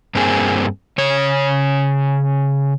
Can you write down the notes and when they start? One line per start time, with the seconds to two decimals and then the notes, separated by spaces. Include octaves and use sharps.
0.15 G2 A#3 C4 G#4
0.98 C#3 C#5